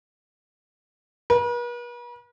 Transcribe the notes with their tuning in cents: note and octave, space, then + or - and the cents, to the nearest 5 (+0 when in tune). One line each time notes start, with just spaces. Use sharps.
B4 -45